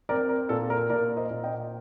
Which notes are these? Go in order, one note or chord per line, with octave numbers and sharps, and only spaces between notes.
C4 A#4 D5
A#4
A#2 A4
A#4
A#2 A#4 D5
C5 D#5
A#2
D#5 G5